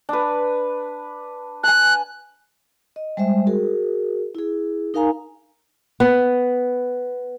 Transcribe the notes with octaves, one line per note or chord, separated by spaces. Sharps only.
D4 B4
G#5 A5 F#6
D#5
G3 G#3 C5 E5
F#4 G#4 A#4
E4 G#4
D#4 A#4 F5 G#5 A#5
B3